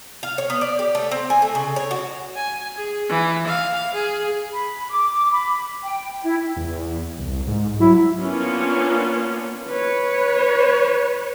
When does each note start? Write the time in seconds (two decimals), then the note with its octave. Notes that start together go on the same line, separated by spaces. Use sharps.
0.23 F5
0.38 C#5
0.50 B3
0.61 D5
0.79 G4
0.95 A3
1.11 C4
1.30 G#5
1.42 A3
1.55 C#3
1.76 C#5
1.91 F#4
2.35 G#5
2.77 G#4
3.09 E3
3.47 F5
3.94 G#4
4.54 B5
4.90 D6
5.31 B5
5.83 G5
6.24 E4
6.56 E2
7.18 C2
7.47 G#2
7.80 F#3 E4
8.19 A#3 B3 C#4 D4 F4
9.68 B4 C#5